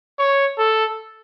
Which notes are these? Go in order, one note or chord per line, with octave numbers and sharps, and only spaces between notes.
C#5
A4